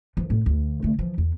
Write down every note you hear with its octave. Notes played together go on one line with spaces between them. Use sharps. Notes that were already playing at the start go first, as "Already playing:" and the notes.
E3 F3
A2
D2
D3 A3
E3 F3
E2